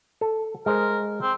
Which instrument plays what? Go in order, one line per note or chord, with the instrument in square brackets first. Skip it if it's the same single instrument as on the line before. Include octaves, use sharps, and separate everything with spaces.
[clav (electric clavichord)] A4
[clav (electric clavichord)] G#3 C5 [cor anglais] A#4
[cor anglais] C4